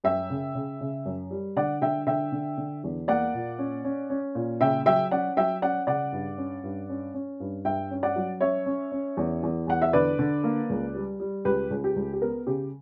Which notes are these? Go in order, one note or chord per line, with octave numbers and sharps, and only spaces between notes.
F#2 E5 G5
C#3
C#3
C#3
F#2
G3
D3 D5 F#5
D3 E5 G5
D3 E5 G5
D3
D3
E2
A#3 D5 F#5
A#2
C#4
C#4
C#4
A#2
C#3 E5 G5
F#3 E5 G5
C#4 D5 F#5
F#3 E5 G5
C#4 D5 F#5
C#3 D5 F#5
G2
C#4
G2
C#4
C#4
G2
G2 E5 G5
C#4
D5 F#5
F#3
C#4 C#5 E5
C#4
C#4
E2
E2
E2 F#5
E5
D3 B4 D5
D3
A#3
C#2
G3
G3
C#2 G4 B4
C#2
G4
C#2
G4
B3 A#4
C#3 G4